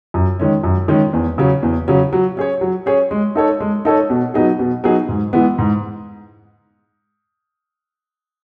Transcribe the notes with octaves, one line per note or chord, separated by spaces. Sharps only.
F#2
D#3 G#3 C#4
F#2
D#3 G#3 C#4
E2
C#3 F#3 C#4
E2
C#3 F#3 C#4
F#3
C#4 G#4 C#5
F#3
C#4 G#4 C#5
G#3
D#4 A4 C#5
G#3
D#4 A4 C#5
B2
F#3 B3 D#4 G#4
B2
F#3 B3 D#4 G#4
G#2
E3 G#3 B3
G#2